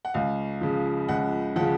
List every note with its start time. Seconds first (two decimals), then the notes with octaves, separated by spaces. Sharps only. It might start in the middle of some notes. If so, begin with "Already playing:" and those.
0.05 F#5
0.14 C#2 F5
0.61 C#3 F3
1.08 C#2 F#5
1.56 C#3 F3 F#5